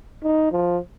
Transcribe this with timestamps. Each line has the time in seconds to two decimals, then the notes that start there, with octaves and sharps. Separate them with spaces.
0.23 D#4
0.52 F3